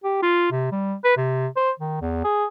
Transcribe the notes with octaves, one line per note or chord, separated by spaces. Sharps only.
G4
F4
C3
G3
B4
C3
C5
D#3
E2
G#4